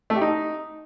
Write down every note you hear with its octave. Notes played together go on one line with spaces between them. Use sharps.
A3
G4
D#4